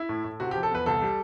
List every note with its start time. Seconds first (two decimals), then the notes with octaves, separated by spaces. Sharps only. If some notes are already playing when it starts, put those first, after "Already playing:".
Already playing: E4
0.09 A2
0.24 A2
0.40 C3 F#4
0.51 G4
0.56 F3
0.63 A4
0.71 E2 B4
0.86 C2 A4
1.02 G3